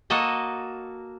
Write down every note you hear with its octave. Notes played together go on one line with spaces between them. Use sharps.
A#3 F#4 A4 D#5